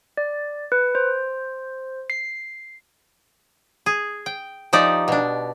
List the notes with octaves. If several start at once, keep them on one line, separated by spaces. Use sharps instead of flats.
D5
B4
C5
C7
G#4
G5
F3 D#4 G4 D5
B2 D4